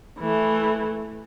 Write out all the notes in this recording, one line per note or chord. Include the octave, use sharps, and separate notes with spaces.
E3 A3